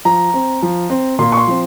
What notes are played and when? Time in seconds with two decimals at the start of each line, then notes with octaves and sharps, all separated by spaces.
0.05 F3 A#5
0.34 C4
0.62 F3
0.90 C4
1.19 A#2 C6
1.32 C#6
1.37 C6
1.47 F3 C4